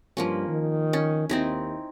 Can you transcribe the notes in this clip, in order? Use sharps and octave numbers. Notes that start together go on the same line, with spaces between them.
G2 F3 A#3 C#4
D#3
C#4
D#2 C4 D#4 E4